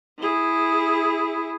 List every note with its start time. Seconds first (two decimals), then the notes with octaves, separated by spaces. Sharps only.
0.19 E4 G#4